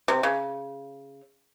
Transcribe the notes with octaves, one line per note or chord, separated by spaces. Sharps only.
C3
C#3